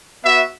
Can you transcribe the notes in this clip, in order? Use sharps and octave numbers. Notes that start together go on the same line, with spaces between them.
B3 F#4 E5